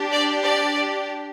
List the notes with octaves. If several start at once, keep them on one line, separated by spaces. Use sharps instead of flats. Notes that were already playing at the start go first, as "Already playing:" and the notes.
Already playing: D4 G4
D5
D5